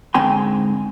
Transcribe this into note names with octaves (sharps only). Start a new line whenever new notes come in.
G#2 D3 C4 G5 G#5 C6